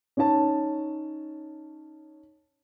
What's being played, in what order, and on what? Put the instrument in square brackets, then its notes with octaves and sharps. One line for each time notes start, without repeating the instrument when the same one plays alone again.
[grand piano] C#4 D#4 C#5 A5